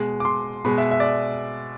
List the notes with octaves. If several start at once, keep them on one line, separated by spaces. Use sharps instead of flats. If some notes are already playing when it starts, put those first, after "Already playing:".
Already playing: B2 G#3
D6
C6
B2 G#3 B5
E5
E5
D5